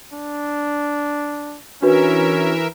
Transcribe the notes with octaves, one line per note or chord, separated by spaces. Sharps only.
D4
E3 C#4 D4 F#4 A#4 B4 E5